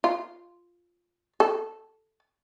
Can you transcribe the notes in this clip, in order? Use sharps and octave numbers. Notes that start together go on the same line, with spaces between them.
F4
A4